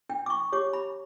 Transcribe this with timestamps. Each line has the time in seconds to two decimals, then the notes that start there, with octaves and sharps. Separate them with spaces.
0.09 D4 G5
0.26 D6
0.30 C#6
0.52 G4 C#5 D6
0.73 B5